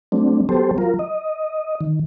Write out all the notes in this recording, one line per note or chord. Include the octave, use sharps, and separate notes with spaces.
F#3 A3 C4 D4
F#3 B3 G4 A4 C5
F#3 F4 A#4
D#5
D#3